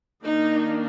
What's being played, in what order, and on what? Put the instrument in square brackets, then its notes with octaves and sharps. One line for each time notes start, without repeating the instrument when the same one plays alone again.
[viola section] D#3 A#3 D4 D#4